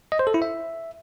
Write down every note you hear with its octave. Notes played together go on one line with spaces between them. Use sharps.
D#5
C5
A4
E4
E5